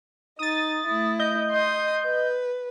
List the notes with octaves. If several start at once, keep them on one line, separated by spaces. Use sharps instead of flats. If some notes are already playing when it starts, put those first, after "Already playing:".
D#4 D#6 A6
A3 E4
D#5 G6
C6 D#6
B4